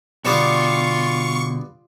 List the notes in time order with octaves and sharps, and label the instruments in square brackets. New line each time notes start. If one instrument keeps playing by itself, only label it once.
[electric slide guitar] B2 D3 [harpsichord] G3 B3 D6 [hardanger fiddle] F4 [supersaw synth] C#6